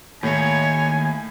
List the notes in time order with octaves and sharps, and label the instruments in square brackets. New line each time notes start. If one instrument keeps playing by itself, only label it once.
[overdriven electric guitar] D#2 [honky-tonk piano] A2 [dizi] C#5 [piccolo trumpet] G#5